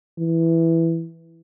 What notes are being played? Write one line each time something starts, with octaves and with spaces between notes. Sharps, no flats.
E3